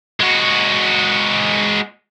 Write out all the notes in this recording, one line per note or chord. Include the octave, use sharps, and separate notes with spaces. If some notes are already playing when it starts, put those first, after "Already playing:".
G#3 F#4